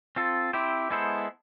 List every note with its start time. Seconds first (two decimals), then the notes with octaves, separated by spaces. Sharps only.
0.16 C4 F4 A4
0.53 C4 E4 G4 C5
0.91 G#3 B3 E4 A4 C5